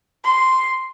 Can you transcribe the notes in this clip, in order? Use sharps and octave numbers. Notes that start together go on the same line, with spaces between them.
C6